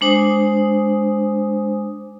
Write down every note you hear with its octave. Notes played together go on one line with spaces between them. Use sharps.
G#3 D4 C5 G#5 D#6